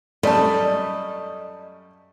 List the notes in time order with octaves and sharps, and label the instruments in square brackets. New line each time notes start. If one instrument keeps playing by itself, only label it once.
[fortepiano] F#2 G3 A3 [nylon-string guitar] D5 A5 [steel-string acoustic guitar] D#5